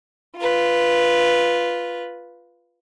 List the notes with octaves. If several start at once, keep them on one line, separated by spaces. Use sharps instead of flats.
F4 B4